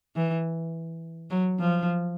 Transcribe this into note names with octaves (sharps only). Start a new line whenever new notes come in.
E3
F#3
F3